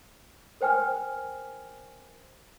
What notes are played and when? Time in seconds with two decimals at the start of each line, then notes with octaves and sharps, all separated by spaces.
0.61 A#4 C5 G5 G#5 F6